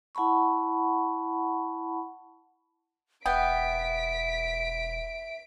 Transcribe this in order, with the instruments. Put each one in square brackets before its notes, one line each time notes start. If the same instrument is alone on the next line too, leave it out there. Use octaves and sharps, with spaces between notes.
[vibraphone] E4 F#5 A5 B5 C#6
[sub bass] E1 [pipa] B3 G5 [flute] E5 [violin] B6 D7